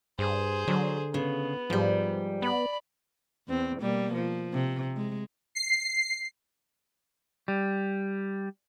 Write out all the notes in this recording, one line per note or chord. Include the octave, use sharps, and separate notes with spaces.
G2 G#4 C5
D3 F#3
C#3 B3
G#2 F3 G3
B3 D5 B5
E2 C4
B2 G3 A#3
F3
C3
G#3
C7
G3